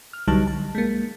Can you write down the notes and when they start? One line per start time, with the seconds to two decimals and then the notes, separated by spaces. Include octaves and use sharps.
0.13 F6
0.28 C2 D3 F#3 G3 D#4 A5
0.47 A5
0.75 G#3 A#3